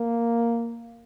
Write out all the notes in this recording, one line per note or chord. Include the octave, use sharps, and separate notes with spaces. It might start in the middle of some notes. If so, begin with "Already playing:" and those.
Already playing: A#3